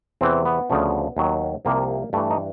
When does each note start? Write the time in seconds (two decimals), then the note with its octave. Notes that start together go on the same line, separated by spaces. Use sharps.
0.21 E2 C3 E3 C4
0.45 B3
0.70 D2 C#3 F3
1.17 D#2 D#3 F#3
1.65 C2 C3 F3 A#3
2.13 G2 E3 A3
2.31 D#4